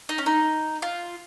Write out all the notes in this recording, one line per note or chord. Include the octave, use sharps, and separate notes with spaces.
D#4
C#4
D#4
F4